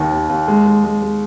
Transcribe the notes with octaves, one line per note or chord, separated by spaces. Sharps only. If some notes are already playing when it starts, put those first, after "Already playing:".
Already playing: D#2 D#3
D#2
D#2
G#3
G#3
G#3
G#3